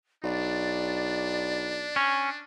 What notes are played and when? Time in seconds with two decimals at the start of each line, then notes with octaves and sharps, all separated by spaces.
0.24 B1 D4 D5
1.96 C#4